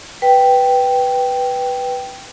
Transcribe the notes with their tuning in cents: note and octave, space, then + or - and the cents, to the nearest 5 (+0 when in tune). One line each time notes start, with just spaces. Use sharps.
B4 +0 G5 -5